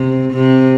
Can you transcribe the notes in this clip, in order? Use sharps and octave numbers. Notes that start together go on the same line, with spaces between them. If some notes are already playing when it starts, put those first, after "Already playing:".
Already playing: C3
C3